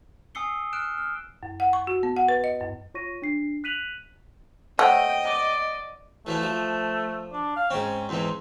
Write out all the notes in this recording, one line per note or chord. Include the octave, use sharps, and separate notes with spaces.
G#5 D#6 E6 C7 C#7 G7
F6 F#6 D7 E7
F6
F#2
F#5
C#6
F#4
B3
F#5
B4
D#5
F#2
F4 C#5 C#6 A#6 D#7
D4 C7
F#6 B6 D#7 F7 F#7
A3 C5 C#5 D#5 F#5 G5
D5
E3 F3 A3 E4
F3
D4
F5
G#2 C4 C#4
E2 G#2 E3 C4